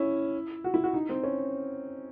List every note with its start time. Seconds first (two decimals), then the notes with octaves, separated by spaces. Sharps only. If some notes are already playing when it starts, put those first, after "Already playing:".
Already playing: C#4 E4
0.64 F#4
0.74 E4
0.84 F#4
0.93 D#4
1.09 C4
1.24 C#4